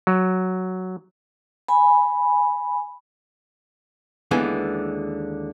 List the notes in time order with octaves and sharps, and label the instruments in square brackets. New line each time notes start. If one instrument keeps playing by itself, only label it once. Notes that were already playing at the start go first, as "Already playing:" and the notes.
[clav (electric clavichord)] F#3
[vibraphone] G#5 B5
[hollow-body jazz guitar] D#2 D3 E3 G#3 B3 G#5